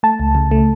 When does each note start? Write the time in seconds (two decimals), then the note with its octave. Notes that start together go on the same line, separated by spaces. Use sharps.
0.03 A3 A5
0.20 C#2
0.35 C#3
0.51 A3